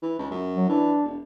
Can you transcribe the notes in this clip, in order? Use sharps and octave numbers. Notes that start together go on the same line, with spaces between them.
E3
C#2
F#2
F#3
E3 D4
E1